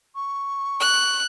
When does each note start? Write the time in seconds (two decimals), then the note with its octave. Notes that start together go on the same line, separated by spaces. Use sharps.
0.15 C#6
0.80 F#6